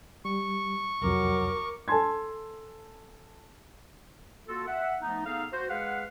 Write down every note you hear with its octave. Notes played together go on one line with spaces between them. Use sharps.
G3 C#6
C2 F2 F#3 A#4 D6
A4 G#5 A5 C6 G#6
A#3 F4 F#4 A4
E5 F#5
F3 A3 B3 D#4
B3 D#4 G#4 A4 F5
F#4 C5
G#3 G#4 B4 F5 F#5